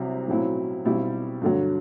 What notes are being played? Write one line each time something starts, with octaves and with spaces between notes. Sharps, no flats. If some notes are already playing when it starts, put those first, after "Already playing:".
Already playing: C2 C3 F#3
B1 A2 F#3 C4 E4
B1 B2 G3 C4 E4
G2 D3 F#3